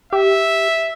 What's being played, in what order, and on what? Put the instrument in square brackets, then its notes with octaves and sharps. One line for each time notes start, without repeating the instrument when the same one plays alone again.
[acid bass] G4 [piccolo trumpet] E5